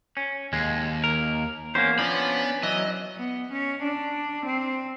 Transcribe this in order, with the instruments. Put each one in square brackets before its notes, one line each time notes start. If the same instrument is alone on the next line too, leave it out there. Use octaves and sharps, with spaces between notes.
[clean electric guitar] C#4
[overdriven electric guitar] D#2 [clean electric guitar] G#3
[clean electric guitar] A#4
[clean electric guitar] E2 A#3 [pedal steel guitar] C#4 C5
[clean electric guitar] F3 [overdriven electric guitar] B3 B5 [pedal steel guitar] C#4 D4
[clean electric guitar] E3 [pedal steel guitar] F#3 [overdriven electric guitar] D#5
[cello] B3
C#4
D4
C4